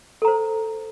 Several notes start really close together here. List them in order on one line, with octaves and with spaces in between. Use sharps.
A4 A#5 C5